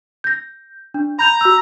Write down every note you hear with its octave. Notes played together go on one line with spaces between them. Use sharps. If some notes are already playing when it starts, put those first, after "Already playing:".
G6 A#6
D4
A#5 B5 G6 F7
F#4 E6